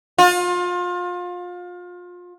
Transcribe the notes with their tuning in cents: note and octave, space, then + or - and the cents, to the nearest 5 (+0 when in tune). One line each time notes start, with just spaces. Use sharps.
F4 +30